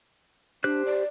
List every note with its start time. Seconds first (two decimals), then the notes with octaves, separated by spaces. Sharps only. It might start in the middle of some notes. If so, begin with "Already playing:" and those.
0.64 D4 G4 C5 F#6
0.85 D5